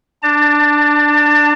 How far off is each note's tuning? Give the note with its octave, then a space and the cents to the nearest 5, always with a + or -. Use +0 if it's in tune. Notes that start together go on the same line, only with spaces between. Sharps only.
D4 +5 A5 +30